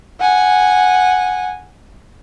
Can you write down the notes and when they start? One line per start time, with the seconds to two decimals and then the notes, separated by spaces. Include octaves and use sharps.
0.20 F#5 G#5